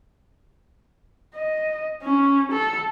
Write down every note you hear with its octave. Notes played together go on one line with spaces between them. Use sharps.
D#5
C#4
A4